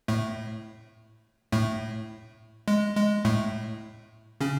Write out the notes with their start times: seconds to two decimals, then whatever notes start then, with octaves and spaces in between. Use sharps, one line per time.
0.08 A2 A3
1.52 A2 A3
2.68 G#3
2.96 G#3
3.25 A2 A3
4.41 C#3 C#4